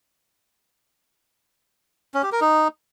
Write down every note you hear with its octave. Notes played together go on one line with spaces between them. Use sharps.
C#4
G4
A#4
D#4